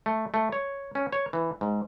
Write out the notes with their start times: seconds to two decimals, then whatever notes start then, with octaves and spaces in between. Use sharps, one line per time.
0.06 A3
0.34 A3
0.52 C#5
0.95 C#4
1.13 C#5
1.33 E3
1.61 G#2